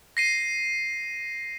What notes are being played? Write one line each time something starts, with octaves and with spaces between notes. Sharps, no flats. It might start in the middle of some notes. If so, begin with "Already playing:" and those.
A#6 C7 D#7